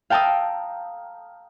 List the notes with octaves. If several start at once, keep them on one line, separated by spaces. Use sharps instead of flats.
F5 G5 A5 A#5 D#6 E6